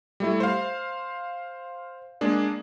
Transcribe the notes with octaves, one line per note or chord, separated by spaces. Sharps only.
G3 A3 E4
C5 F5
G#3 A#3 D4 G#4